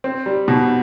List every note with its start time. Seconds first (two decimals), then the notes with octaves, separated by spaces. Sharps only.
0.04 C4
0.26 G3
0.48 B2